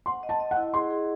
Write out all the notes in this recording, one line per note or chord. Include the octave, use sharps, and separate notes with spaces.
F#5 C6
D#5
A5
D#5
F#5
E4
G#4 C6
G#4